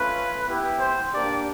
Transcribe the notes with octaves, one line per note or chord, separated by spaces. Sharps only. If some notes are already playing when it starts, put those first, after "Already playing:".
Already playing: A3 C#4 F4 B4
B3 E4 G4
C5
A#3 D4 G4 D5